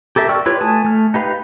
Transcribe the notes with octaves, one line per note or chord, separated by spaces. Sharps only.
G4 A4 A#4 E5
D5 G5 C#6 E6 F6
E4 F4 G4 B4 C#5
A3 G#5 A5 D#6
A3 F6
D#4 G4 B4 F5